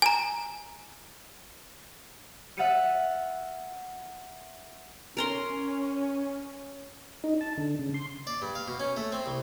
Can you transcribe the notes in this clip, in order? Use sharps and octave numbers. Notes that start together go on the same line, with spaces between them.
G#5 A#5
E5 F#5 F6 A6 C#7 D#7
C#4 A#4 A#5 C6
D#4
A5
D3
C#3
C6
D5
G2
F5
B2
C#4
A3
C4
C2